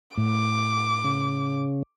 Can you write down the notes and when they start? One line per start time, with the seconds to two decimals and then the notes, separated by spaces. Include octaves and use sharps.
0.18 A2 D6
1.04 C#3